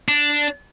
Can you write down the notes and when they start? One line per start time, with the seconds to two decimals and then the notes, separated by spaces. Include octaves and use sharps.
0.08 D4